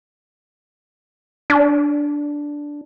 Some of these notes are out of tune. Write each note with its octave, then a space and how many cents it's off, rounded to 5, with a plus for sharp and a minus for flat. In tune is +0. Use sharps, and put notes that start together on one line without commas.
D4 -5